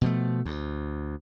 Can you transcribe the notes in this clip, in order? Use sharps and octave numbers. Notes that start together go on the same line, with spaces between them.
B2 F3 A3
D2